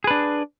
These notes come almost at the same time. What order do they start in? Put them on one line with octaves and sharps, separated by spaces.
G#4 B4 D4